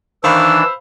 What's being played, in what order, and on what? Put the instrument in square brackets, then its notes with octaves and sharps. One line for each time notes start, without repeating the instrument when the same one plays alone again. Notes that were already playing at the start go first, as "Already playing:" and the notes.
[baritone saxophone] D#3 [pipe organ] E3 D4 [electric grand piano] C5 F5 B5 [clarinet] E6